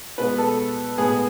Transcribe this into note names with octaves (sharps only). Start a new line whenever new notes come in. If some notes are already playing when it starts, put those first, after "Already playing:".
B2 G#3 B3 B4
A4
A2 G#3 B3 G#4